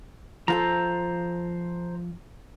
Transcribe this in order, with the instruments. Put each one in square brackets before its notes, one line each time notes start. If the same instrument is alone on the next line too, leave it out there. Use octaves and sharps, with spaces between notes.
[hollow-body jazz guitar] F3 F4 A4 [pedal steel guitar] C5 A#5